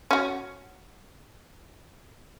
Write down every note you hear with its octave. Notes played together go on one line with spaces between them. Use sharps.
C#4 F#4